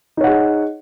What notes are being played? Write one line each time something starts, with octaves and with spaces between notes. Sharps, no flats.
D#4 G#4 C#5 F#5